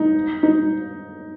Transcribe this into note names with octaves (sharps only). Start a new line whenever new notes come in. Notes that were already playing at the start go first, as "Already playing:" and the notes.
Already playing: D#4
D#4